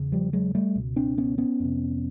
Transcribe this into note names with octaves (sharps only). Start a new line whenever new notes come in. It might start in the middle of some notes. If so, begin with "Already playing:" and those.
Already playing: E2 C#3
F3 G3
F#3 G#3
G3 A3
C#2 B2
C4 D4
B3 C#4
B3 C#4
F2 C3